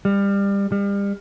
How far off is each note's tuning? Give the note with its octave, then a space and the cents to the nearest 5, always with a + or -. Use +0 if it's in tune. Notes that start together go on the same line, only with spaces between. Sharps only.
G3 +25
G3 +35